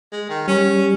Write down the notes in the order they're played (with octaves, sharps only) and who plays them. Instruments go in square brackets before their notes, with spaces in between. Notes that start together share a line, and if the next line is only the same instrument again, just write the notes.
[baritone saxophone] G#3
D#3
[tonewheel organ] G3 [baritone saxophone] C#4